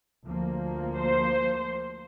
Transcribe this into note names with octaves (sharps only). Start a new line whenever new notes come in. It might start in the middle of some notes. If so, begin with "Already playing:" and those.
D2 F3 A#3
C5